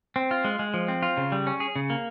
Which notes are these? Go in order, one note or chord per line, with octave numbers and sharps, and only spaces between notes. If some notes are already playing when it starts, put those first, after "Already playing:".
C4
F4
G#3
G#3
F3
C4
F4
C#3
G3
C#4
G#4
C#3
A#3